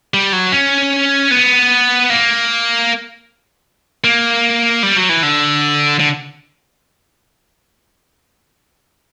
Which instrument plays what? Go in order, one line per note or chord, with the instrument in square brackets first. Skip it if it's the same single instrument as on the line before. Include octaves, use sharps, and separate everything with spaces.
[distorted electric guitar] G3
F#3
C#4
B3
A#3
A#3
G3
F#3
E3
D3
D3